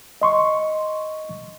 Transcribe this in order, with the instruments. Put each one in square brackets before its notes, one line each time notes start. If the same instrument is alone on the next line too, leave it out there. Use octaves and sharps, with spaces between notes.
[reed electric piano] D#5 C6 C#6